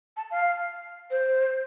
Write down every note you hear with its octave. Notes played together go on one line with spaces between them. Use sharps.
A5
F5
C5